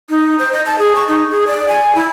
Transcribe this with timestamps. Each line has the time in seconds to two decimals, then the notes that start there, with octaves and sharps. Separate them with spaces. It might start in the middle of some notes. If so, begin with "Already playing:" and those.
0.10 D#4
0.39 C5
0.53 D#5
0.66 A5
0.78 G#4
0.95 C#6
1.08 D#4
1.30 G#4
1.47 D5
1.68 G#5
1.95 E4